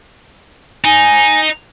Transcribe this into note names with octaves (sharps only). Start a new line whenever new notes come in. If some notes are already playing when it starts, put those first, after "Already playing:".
D#4 G#5